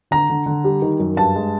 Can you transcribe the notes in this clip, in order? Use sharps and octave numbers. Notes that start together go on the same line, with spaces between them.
D3 A#5
D3
D3
G3
D#3
F#2
G2 A5
G#3